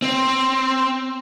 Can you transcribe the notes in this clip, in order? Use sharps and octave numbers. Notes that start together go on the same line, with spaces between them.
C4